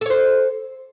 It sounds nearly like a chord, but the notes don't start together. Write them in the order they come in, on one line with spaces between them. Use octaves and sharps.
A4 C#5 C5